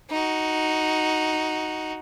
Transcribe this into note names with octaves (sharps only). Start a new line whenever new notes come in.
D#4 F#4